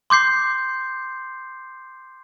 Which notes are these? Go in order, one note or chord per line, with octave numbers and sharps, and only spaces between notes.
C6 D6 G6 C7